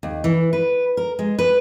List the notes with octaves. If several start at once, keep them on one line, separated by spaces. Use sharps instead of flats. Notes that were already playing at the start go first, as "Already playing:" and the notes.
D#2
E3
B4
A#4
G#3
B4